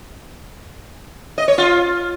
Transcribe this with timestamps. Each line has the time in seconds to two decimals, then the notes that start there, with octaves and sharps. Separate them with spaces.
1.38 D#5
1.48 C#5
1.58 F4